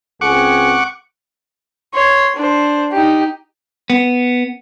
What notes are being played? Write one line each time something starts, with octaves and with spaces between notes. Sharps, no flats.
C#2 C4 G#4 F#5 C#6 D6
C#5 C6
D4 C5
D#4 G4
B3